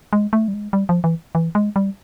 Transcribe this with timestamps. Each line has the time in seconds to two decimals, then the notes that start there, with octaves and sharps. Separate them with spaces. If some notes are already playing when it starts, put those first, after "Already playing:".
0.13 G#3
0.33 A3
0.48 G3
0.54 G#3
0.73 G3
0.89 F3
1.04 E3
1.35 E3
1.55 G#3
1.76 G3